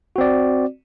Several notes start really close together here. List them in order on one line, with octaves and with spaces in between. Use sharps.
F#4 C4 D5